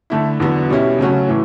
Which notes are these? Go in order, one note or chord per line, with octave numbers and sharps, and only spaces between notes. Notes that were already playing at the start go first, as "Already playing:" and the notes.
D3 A3 E4
E2 D3 F#3 B3 F#4
B2 G3 C#4 E4
C#3 F#3 A3 C#4 F#4
A2 E3